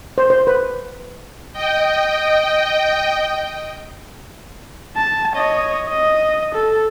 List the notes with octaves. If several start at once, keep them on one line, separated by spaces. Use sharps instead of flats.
C5
C5
B4
D#5 G5
A5
C#5 D#5
D#5
A4